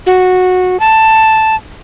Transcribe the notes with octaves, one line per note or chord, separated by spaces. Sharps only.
F#4
A5